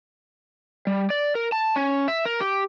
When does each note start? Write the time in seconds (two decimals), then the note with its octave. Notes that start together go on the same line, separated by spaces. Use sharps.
0.87 G3
1.10 D5
1.35 A#4
1.52 A5
1.76 C#4
2.08 E5
2.25 A#4
2.41 G4